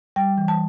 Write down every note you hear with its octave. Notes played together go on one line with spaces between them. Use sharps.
G3 G5
E3
A5